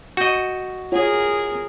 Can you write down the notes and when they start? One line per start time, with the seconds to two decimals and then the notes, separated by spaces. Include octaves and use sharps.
0.17 F#4 D#5 G6 C#7
0.92 F4 G#4 A#4 C#5 F#5